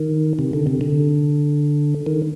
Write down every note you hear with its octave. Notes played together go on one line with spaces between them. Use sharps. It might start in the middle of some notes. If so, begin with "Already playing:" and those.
Already playing: D#3
C3
D3
C3
D3
D#3